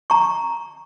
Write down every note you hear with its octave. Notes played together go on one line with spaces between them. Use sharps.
A#5 C#6